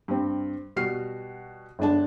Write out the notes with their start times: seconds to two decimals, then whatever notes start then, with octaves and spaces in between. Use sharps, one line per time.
0.08 G2 C4
0.76 B2 G3 F#4 F6 C7
1.79 G1 G#3 D4 A5